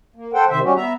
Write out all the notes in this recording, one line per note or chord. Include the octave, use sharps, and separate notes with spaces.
A#3
A4 C5 F#5 G5
C3 D#3 C5 E5
G3 C#4 F#4 G4
B3 E5 A#5